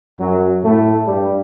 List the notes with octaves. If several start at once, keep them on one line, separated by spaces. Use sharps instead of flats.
F#2 F#3
A2 A3
G2 G3